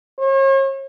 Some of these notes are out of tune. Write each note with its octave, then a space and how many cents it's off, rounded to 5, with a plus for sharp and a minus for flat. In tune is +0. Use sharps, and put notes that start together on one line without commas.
C#5 -40